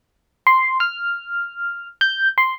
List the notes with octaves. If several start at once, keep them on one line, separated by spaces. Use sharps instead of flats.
C6
F6
G6
C6